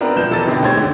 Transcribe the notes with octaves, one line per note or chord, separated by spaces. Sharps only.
B3 C4 D4 A#4 B4
B2 F3 G6 E7
D#1 E3 A4 A#4 D#5 A6
B2 D3 D#3 C4
D2 G4 C5 C#5 G#6 A6
D3 D#3 G4